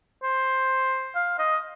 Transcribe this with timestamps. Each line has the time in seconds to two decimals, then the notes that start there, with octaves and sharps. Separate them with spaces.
0.23 C5
1.16 F5
1.39 D#5